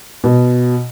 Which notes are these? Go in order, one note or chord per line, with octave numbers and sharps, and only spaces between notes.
B2